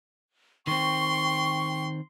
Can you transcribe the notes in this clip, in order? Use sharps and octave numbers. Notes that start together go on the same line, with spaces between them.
D#3 C4 G5 C6 C#6